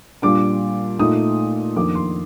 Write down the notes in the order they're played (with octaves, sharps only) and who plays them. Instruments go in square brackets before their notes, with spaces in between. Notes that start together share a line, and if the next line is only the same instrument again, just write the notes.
[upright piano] A#2 G3 D4 D6
A#2 A3 D#4 D#6
F2 D#3 A#3 D4 D6
C6